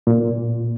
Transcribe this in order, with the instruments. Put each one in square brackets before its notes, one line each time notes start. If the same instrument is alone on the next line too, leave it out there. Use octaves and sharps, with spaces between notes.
[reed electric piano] A#2